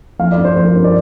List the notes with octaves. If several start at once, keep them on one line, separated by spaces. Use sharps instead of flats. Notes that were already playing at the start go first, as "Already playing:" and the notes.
F3 F5
D5
G2
C5
F3 C5
A#4
G2 C5
D5